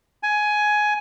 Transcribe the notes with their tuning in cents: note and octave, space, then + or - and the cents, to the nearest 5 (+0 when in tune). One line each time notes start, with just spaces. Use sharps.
G#5 +15